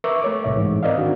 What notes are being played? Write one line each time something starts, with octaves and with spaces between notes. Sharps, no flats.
A#4 B4 E5 C#6 D6 E6
A3 C#5 D6
C2 A2 E5
G#2 E3
C4 A#4 D5 D#5 F5
D#3 D4 F#4